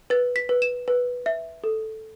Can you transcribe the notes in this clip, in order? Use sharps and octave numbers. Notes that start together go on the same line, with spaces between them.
B4 A6
B6
B4
E7
B4
E5
A4